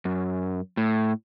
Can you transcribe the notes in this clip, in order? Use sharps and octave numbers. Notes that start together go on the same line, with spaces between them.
F#2
A2